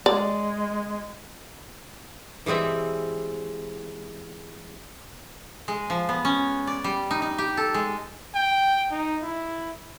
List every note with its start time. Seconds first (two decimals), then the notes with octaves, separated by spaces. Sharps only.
0.06 G#3 D5
2.46 E3 G3 G#3 C4 E5
5.68 G#3
5.90 F3
6.09 B3
6.25 C#4
6.67 D5
6.84 G3
7.11 D#4
7.22 D#4
7.38 G4
7.57 A4
7.74 G#3
8.35 G5
8.91 D#4
9.23 E4